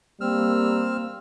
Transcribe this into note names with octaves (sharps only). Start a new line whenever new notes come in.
G3 A#3 C4 E6 F6